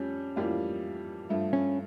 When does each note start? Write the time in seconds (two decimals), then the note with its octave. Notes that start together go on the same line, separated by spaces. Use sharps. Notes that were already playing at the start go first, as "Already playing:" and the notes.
Already playing: F2 G3 C#4
0.36 F2 E3 G3 A#3
1.29 G2 F3 A3
1.53 C#4